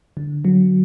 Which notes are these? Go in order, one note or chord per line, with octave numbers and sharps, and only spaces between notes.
D3
F#3